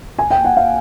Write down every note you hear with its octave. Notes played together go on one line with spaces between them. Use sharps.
G#5
G5
F#5
F5